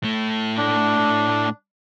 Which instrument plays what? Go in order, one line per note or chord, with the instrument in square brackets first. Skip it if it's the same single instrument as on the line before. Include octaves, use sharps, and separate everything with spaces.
[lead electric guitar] A2 A3
[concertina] D4